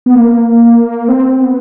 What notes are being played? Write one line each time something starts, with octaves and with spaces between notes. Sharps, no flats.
B3
A#3
C4
B3